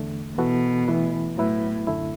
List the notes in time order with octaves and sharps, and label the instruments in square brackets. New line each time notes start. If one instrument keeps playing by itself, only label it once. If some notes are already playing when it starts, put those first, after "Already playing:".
Already playing: [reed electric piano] E2 D3 A3
[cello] B2 [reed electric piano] E3 B3 F#4 A4
[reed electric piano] E3 A3 E4 B4
[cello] A2 [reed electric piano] F#3 B3 E4 B4
[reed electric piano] F#2 D3 A3 E4